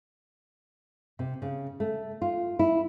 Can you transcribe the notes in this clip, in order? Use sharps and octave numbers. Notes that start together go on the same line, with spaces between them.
C3
C#3
A3
F4
E4